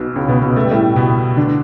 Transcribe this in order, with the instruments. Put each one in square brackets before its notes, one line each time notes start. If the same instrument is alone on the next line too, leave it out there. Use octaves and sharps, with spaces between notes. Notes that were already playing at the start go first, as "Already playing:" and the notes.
Already playing: [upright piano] B1 B2
C#2 C#3
B2 B3
B2 B3
A3
G3
A2 A3
B2 B3
D3 D4